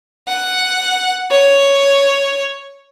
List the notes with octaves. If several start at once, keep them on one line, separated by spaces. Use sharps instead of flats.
F#5
C#5